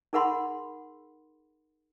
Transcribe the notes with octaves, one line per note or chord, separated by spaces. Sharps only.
D#4 G#4 A#4 F#5 B5 C6